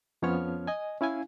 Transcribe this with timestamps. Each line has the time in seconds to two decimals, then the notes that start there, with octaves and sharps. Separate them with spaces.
0.22 F2 F3 B3 C#4 C#5 F6
0.67 D#5 G#5
1.01 C#4 E4 F5 G#5